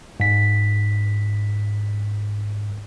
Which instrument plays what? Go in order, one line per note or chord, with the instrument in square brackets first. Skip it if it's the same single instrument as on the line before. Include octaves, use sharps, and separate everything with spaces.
[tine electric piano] G#2 B6